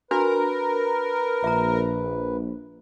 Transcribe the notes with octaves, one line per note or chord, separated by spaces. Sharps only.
D4 F#4 A#4 B4
A#1 E5 A#5